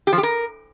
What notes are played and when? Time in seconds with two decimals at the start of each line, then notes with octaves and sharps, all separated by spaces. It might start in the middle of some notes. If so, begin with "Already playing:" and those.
0.07 G4
0.12 F3
0.18 G4
0.23 A#4